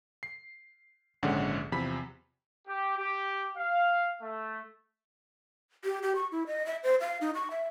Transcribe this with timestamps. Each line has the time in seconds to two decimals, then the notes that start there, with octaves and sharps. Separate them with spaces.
0.23 C7
1.23 A#1 D#2 G#2 D3 C#4 F#5
1.72 E2 C3 F3 B5 B6
2.67 G4
2.98 G4
3.57 F5
4.22 A3
5.85 G4
6.03 G4
6.16 C#6
6.32 E4
6.47 D#5
6.66 E5
6.83 C5
7.01 F5
7.21 D#4
7.35 C#6
7.51 E5